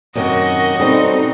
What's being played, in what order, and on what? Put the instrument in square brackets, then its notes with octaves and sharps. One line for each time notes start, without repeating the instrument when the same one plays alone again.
[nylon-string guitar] F#2 C3 D#3 [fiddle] F#4 D#5
[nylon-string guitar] B2 G3 [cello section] C4 D#4 [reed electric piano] C#4 A4 C5